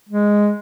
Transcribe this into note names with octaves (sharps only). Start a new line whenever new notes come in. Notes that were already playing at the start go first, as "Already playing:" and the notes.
G#3